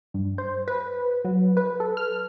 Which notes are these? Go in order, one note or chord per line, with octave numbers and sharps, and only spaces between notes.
G2
C5
B4
F#3
B4
A4
F6